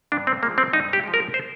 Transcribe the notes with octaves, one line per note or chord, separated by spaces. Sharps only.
G2 D4
C4
F3 G#3 A#3
C4
G2 D#4
G4
F3 G#3
A#4
C5